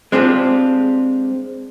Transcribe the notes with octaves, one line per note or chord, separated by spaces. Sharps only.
G#3 C4 D4 F4 G4